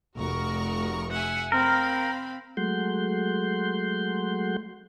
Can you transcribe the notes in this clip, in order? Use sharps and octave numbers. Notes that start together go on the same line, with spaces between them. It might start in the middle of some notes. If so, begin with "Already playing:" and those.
F1 F#4 A#4 C#6
E5 F#5 G#5
C4 A#4 F5 B5
F#3 G#3 A3 F#5 C6 G6